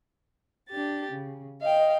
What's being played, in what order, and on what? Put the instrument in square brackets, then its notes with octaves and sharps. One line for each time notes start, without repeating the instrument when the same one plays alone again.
[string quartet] D4 G4 A6
C#3
[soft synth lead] D#5 [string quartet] F5 G5